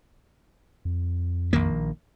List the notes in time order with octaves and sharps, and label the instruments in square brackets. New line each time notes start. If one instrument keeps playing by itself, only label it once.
[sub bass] F2
[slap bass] A#1 D#3 A#3